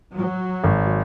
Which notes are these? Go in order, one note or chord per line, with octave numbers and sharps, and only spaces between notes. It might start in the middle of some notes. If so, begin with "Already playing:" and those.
F#3
G#1